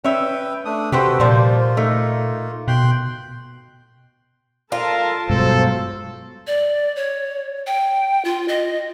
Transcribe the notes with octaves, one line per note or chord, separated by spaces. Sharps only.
C#4 B4 E5 G5
A3 D4 D#6
C3 F#4 G4 A4 B4 C5 G5
A#2 F3 G3 A#3 F4 C5
A3 D#4
B2 G5 C6 F#6
F4 A4 A#4 A5
G2 B2 F#3 G#3 A4 C5
D5
C#5
G5
F4
D#5